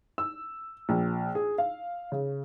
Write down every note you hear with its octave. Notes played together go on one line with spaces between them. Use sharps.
E6
A#1
G#4
F5
C#3